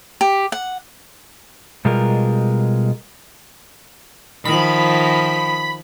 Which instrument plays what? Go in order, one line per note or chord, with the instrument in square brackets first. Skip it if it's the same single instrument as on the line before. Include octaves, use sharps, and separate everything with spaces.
[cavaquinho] G4
F#5
[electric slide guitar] B2 G3 G#3 F4 A#4
[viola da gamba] D#3 F3 [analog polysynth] B5